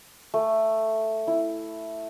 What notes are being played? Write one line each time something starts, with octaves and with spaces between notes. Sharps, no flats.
A3
E4